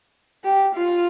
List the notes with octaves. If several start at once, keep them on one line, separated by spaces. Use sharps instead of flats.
G4
F4